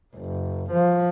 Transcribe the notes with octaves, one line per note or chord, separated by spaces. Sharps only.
F#1
F3